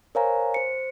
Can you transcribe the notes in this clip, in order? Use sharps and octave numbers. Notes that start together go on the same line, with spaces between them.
A#4 C5 C#5 F5 G#5 A#5
C5 C#7